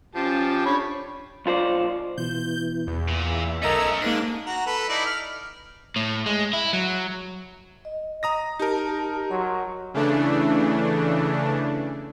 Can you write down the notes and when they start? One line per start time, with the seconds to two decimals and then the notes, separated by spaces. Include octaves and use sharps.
0.15 F3 C#4 G4 A5
0.66 D4 C#5 B5 C#6
1.46 B1 F4 C5 D5
2.17 B2 E3 G6
2.87 E2
3.08 A#2
3.27 E5
3.62 B1 A3 C#4 A4 A#4 D#5 E6 G#6
4.02 G#2 A#3 D4 D#7
4.46 F#4 A#5
4.66 A4 B4
4.88 D#4 E4 D5
5.06 F6
5.96 A2
6.26 G#3
6.53 E4
6.73 F#3
7.85 D#5
8.23 A#5 D#6 A#6
8.59 D#4 G4 A#4 A5
9.31 F#3 C6
9.94 C#3 E3 A3 D4